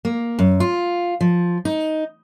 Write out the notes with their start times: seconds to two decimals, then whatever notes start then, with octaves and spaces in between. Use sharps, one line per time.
0.05 A#3
0.39 F#2
0.60 F4
1.21 F3
1.65 D#4